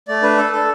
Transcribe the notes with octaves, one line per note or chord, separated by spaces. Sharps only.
A3 D5
D4 B4
A4
A4